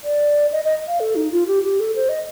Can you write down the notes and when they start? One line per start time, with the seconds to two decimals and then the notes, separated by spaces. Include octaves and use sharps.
0.04 D5
0.52 D#5
0.65 D#5
0.88 F5
1.00 A4
1.16 D#4
1.32 F4
1.47 G4
1.64 G4
1.80 A4
1.96 C5
2.09 D#5